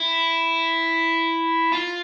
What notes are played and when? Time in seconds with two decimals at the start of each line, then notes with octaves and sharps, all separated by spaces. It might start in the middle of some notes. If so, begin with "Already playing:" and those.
Already playing: E4
1.72 F4